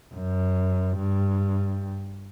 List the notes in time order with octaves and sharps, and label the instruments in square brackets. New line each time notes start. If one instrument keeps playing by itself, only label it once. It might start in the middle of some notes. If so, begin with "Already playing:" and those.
[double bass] F#2
G2